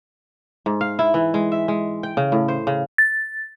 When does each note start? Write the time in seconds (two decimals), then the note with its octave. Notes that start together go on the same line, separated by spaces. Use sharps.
0.66 G#2
0.81 F5
0.99 E4
1.14 E3
1.34 G#3
1.52 E5
1.68 G#3
2.03 G5
2.17 C#3
2.32 A2
2.48 C5
2.67 C#3
2.98 A6